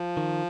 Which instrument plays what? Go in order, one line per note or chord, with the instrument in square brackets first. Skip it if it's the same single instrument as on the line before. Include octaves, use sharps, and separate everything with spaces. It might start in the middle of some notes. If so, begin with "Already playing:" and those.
Already playing: [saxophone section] F3
[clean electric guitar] D#3